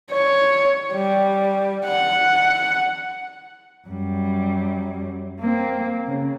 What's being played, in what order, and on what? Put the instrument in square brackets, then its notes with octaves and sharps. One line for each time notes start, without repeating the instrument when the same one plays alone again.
[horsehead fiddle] C#5
G3
F#5
[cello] F#2 G3
A#3 C4
C#3